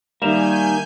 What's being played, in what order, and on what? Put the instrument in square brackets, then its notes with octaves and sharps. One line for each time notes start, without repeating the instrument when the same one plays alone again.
[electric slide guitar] D#3 A#3 [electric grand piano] G3 [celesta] E5 E7 F7 [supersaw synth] G#5 G6